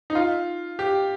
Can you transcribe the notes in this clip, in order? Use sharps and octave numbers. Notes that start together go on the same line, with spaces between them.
D#4
F4
G4